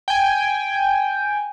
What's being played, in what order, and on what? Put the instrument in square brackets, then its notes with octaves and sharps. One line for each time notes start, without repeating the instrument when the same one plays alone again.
[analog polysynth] G5 G#5